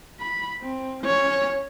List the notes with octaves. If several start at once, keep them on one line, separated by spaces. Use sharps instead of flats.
B5
C4
C#4 C#5